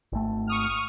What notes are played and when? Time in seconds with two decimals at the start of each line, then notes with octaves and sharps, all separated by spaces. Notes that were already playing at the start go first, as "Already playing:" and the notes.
0.12 G#1 A3
0.47 C#6 D#6 F6